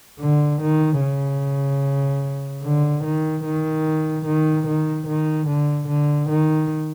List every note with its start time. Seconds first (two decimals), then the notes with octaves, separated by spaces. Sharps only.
0.20 D3
0.61 D#3
1.01 C#3
2.64 D3
3.04 D#3
3.45 D#3
4.26 D#3
4.67 D#3
5.07 D#3
5.47 D3
5.88 D3
6.29 D#3